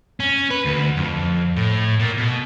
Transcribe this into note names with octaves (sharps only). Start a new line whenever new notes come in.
C#4
B4
D2
F2
A2
A#2
B2